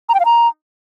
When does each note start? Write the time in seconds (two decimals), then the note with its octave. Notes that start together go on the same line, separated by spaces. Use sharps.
0.09 A#5
0.14 G5
0.20 F5
0.25 A#5